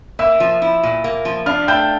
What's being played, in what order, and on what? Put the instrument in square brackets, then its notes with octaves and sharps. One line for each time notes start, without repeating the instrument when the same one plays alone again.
[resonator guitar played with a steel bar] A#3 [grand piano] E5 E6
[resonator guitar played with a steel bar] F3
E4
A#2
A#3
F3
[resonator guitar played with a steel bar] D4 [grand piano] F5 F6
[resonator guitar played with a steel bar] A3 [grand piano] G5 G6